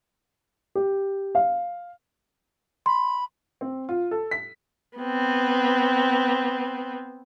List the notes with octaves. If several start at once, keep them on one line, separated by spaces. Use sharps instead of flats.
G4
F5
B5 C6
C4
F4
A4
B6
B3 C4